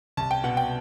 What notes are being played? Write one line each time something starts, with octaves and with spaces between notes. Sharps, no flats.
C2 A5
G5
B2 F#5
G5